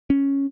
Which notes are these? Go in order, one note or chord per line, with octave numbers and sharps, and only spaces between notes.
C#4